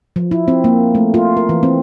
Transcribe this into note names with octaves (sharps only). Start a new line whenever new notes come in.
F3
E4
C4
A#3
A3
F4
A#4
E3
C4